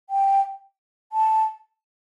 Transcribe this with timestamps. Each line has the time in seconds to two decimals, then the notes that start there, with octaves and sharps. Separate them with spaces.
0.10 G5
1.12 A5